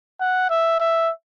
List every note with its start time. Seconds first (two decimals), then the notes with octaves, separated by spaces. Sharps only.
0.21 F#5
0.50 E5
0.80 E5